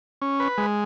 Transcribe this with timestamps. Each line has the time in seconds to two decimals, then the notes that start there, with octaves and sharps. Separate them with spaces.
0.22 C#4
0.40 B4
0.58 G#3